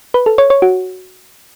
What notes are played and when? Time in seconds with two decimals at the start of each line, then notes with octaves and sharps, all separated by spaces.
0.14 B4
0.26 A4
0.38 C#5
0.50 C#5
0.62 F#4